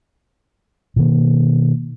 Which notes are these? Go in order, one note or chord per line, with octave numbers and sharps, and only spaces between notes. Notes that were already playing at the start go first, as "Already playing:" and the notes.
B2 D#3 A#3